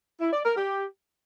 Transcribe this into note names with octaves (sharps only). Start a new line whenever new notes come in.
E4
D5
A#4
G4